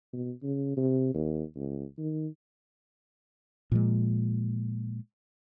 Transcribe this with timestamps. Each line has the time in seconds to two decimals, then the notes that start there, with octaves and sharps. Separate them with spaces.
0.13 B2
0.43 C#3
0.77 C3
1.14 D#2
1.56 C#2
1.98 D#3
3.72 A#2 F3 G#3